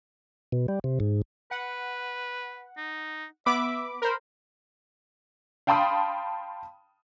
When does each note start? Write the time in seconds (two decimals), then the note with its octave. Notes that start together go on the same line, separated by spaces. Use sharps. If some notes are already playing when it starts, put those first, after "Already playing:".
0.52 B2
0.68 G3
0.84 C3
1.00 G#2
1.51 B4 F#5
2.77 D#4
3.46 B3 E5 B5 D6
4.02 A#4 C5 B5
5.67 F5 G5 A5 B5 C6 D#6